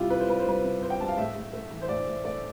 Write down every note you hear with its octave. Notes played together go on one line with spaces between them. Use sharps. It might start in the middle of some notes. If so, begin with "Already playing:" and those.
Already playing: C3 G3 E4 F4 G4
C3 B4
C5
G3 B4
C5
G3 B4
C3
C3 C5
G5
G3 A5
F5
A2 E5
A2
A3
E3
C5
A2 D5
A2
A3 D5